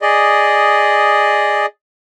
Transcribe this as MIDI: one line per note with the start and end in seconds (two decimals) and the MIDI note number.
0.02 1.66 68
0.02 1.66 74
0.02 1.66 75